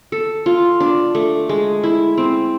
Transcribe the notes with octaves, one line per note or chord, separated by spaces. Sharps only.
A4
F4
D4
A3
G#3
E4
C4